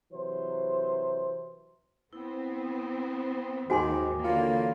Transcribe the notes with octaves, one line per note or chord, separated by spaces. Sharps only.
C3 E3 F#3 C5
B3 C4 E4
D#2 G#2 D#3 F#4 G5 G#5 C6 D6
D3 E3 A#3 D4 F4 A4 C#5